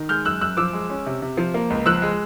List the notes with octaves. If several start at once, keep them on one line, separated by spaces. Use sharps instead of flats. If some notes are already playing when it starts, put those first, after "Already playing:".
Already playing: D#3
G#3 F6 G6
F#2 E6 F#6
F#2 E6 F#6
F3 D6 E6
G#3
C#4
C3
C3
F3
A#3
C#2
F3 E6 F#6
G#3